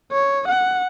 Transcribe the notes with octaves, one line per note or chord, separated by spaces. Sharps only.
C#5
F#5